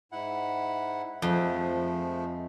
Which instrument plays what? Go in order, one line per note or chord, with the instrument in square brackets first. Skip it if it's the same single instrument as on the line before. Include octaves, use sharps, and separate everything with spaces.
[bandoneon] G#2 E4 F#5
[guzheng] F2 [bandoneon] F3 G#3 A3